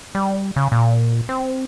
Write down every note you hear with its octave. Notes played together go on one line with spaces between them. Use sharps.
G3
C#3
A#2
C4